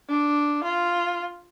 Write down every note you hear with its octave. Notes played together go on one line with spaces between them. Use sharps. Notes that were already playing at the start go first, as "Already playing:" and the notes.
D4
F4